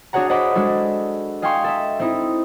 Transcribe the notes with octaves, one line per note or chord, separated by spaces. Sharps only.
D4 F#4 G#4 C#5 F#5 A#5
C5 D#5 F#5 B5 D6
G#3 D4 F#4 A4
D#5 F5 G5 G#5 C6 C#6
A4 E5
C4 D#4 E4